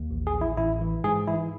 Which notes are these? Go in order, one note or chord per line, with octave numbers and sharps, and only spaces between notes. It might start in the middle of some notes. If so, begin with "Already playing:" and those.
Already playing: D#2
A1
G#4
A1
E4
A1 E4
E3
G#2 G#4
E3 E4